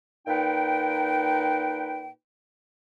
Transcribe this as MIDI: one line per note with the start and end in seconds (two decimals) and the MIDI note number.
0.27 2.08 46
0.27 2.08 63
0.27 2.08 71
0.27 2.08 79